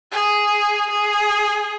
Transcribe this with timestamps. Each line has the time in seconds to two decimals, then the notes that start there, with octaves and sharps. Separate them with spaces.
0.12 G#4
0.90 G#4